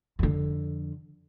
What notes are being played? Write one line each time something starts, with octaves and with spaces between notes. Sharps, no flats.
F2 D3